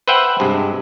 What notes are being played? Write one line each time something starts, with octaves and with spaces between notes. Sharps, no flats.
B4 C5 E5 F#5 G5
G2 C3 G#3